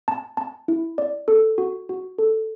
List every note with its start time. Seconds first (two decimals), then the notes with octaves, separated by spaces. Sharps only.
0.08 A5
0.37 A5
0.68 E4
0.98 D5
1.28 A4
1.58 F#4
1.89 F#4
2.18 A4